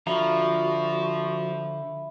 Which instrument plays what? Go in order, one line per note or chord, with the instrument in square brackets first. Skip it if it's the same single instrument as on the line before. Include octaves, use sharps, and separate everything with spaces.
[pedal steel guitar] D3 F5 A#5 [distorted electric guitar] F3 [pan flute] F#4 [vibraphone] E5 B5